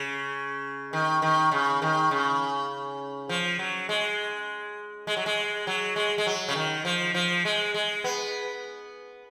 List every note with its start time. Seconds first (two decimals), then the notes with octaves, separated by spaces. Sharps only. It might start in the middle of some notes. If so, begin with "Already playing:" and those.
Already playing: C#3
0.93 D#3
1.22 D#3
1.51 C#3
1.82 D#3
2.11 C#3
3.29 F3
3.59 F#3
3.89 G#3
5.07 G#3
5.17 F#3
5.26 G#3
5.67 F#3
5.96 G#3
6.18 G#3
6.27 F#3
6.49 C#3
6.55 D#3
6.85 F3
7.14 F3
7.45 G#3
7.74 G#3
8.04 B3